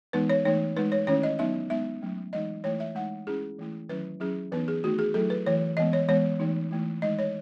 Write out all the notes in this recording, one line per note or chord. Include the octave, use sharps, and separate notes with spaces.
E3 G#3 B3 D#4 B4
C#5
E3 A3 D#4 C#5
G#3 D#4 B4
C#5
D#3 A3 C#4 E4 C#5
D#5
F#3 B3 D#4 E5
G#3 B3 D#4 E5
F#3 A3 C#4
E3 G#3 D#4 D#5
E3 A3 E4 C#5
E5
G#3 D#4 F#5
G#3 C#4 E4 G#4
E3 A3 E4
D#3 F#3 C#4 E4 B4
F#3 C#4 E4 G#4
E3 B3 D#4 B4
G#4
D#3 A3 D#4 F#4
G#4
F#3 A3 E4 A4
B4
E3 A3 E4 C#5
E3 G#3 B3 D#5
C#5
E3 G#3 B3 C#5
E3 A3 D#4
E3 A3 E4
D#3 G#3 D#4 D#5
C#5